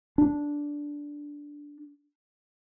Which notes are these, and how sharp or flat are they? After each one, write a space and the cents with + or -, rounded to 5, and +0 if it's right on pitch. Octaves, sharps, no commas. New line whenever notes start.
D4 -5